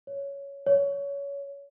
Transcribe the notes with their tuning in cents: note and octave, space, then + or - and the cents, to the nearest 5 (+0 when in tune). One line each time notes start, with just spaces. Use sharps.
C#5 +10
C#5 +20